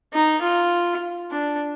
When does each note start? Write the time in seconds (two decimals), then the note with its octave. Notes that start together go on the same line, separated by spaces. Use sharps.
0.13 D#4
0.42 F4
1.31 D4